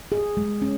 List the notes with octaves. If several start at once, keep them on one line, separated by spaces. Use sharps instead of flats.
G#4
G#3
C#4